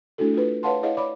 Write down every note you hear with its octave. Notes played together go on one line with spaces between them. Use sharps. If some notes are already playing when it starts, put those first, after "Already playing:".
A3 D4 E4 F#4 A4
F4 B4
B4 C#5 F5 F#5 A5 C6
E4 G#4 C#5 D#5 F5 F#5
C#5 D5 B5 D6